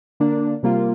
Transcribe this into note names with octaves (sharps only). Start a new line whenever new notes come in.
D3 A#3 D4
C3 G3 A#3 F4